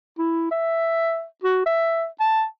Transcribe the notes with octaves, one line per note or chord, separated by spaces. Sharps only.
E4
E5
F#4
E5
A5